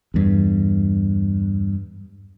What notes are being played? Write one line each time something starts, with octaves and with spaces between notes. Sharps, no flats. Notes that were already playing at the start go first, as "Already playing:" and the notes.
E2 G2